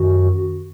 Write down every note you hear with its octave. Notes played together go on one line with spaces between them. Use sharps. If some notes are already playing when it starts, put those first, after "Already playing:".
Already playing: F#2 D#3 F#4